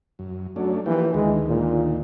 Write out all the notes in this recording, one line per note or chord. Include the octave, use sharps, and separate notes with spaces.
F#2
F#3 A3 C#4 D4
E3 F3 A#3 G4
D2 D#3 G#3
A#2